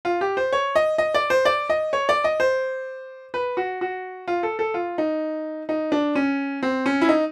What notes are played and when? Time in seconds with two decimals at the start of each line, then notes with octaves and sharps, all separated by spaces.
0.05 F4
0.21 G4
0.37 C5
0.53 C#5
0.76 D#5
0.98 D#5
1.14 D5
1.30 C5
1.45 D5
1.70 D#5
1.93 C#5
2.09 D5
2.24 D#5
2.40 C5
3.34 B4
3.57 F#4
3.81 F#4
4.28 F4
4.43 A4
4.59 A4
4.74 F4
4.98 D#4
5.69 D#4
5.92 D4
6.15 C#4
6.63 C4
6.86 C#4
7.01 E4
7.09 D#4